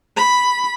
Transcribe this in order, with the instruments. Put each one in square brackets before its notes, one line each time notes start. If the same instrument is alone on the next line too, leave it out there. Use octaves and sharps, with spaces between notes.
[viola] B5